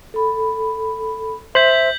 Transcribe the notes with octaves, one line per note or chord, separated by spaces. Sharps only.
A4 B5
C5 E5 G6 B6 F#7